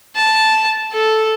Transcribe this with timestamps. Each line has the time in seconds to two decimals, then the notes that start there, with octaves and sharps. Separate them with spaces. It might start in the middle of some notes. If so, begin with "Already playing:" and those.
0.16 A5
0.94 A4